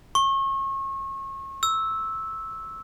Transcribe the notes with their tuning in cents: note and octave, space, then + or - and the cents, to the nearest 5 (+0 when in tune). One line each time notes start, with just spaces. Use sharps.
C#6 -35
E6 -10